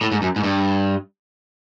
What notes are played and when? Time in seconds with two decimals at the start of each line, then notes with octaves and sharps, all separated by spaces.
0.01 A2
0.12 G#2
0.22 F#2
0.36 G#2
0.44 G2